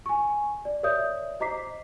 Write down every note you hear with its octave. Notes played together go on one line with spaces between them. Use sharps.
G#5 C#6
D5
A#4 C#5 D5 E5 D#6 G6
C5 D#5 A#5 D6 B6 C7